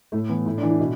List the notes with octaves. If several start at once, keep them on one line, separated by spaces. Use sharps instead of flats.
A2 A3
E3 B3
A2 E4
D4
E3
E4
B2